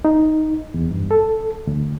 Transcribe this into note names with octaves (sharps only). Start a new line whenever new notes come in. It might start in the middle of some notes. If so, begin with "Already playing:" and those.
D#4
E2
G2
A4
D2